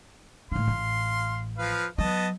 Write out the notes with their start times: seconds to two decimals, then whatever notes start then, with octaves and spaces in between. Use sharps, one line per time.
0.52 A2 D#3 F5 C6
0.68 A1
1.58 F3 B4 F5
1.98 F#3 B3 D#5 A5